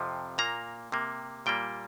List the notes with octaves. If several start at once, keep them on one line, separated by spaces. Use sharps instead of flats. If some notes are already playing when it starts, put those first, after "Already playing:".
Already playing: F2 C3 F3
A#2 A#3 A#5
C3 A#3
A#2 G3 A#3 G5